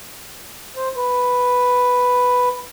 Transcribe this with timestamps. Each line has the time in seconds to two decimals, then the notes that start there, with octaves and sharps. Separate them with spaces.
0.76 C5
0.96 B4